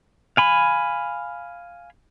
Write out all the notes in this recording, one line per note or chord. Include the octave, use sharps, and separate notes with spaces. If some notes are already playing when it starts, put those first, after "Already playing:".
F5 G#5 B5